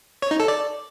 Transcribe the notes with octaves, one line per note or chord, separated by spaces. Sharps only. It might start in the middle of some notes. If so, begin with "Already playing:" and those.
C#5
D#4
A4
D5